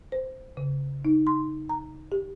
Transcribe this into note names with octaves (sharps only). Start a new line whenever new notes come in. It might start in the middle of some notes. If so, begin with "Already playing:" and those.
C5
C#3
D#4
C6
A#5
G4